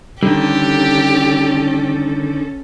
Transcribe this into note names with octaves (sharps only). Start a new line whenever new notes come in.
D3 D#3 G3 C#4 G4 A4